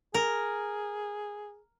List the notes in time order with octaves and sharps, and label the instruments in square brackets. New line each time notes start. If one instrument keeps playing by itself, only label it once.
[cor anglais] G#4 [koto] A#4